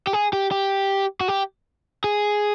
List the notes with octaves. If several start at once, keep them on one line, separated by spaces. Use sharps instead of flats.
G4
G#4
G4
G4
F#4
G4
G#4